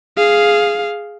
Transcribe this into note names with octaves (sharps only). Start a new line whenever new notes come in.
G#4 F5